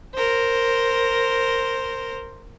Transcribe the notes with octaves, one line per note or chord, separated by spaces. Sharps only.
A#4 C5